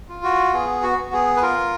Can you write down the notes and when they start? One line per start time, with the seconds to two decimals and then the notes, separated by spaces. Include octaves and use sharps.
0.09 F4
0.23 F#4
0.53 B3 G#4
0.83 F#4
0.98 B3
1.13 G#4
1.36 B4
1.42 F4 A#4